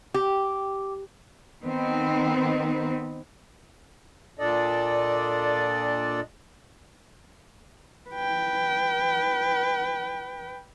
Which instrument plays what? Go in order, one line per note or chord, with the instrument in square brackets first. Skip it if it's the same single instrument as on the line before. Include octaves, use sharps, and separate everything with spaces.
[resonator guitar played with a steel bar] G4
[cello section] D#3 B3 C4 D#4
[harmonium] A#2 D4 A4 D5 D#5
[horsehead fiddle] B4 G5